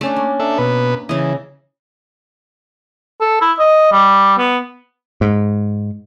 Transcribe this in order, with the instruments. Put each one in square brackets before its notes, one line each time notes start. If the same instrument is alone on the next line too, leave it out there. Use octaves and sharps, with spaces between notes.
[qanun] A3 C#4 D4
A#3
[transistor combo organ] D4 A4 E5
B2 B4
[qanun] C#3 D#5 [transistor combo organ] E3
[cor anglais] A4
E4
D#5
G3
B3
[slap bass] G#2